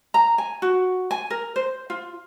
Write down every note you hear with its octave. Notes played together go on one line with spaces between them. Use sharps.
A#5
G#5
F#4
G#5
A#4
C5
F4